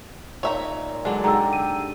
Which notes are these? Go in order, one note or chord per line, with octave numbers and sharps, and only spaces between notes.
A#2 D#4 C#5 E5 A#5
D3 F#3 G#3 D4
G#2 D3 G4 D#5 A#5 E6
D#7